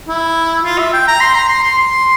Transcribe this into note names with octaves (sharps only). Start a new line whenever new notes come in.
E4
F4
E5
G5
A#5
C6
A#5
C6
C6
C6